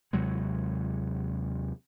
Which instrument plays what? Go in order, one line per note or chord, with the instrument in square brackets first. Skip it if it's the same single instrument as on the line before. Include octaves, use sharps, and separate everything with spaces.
[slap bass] D#2 C3 F#3 G#3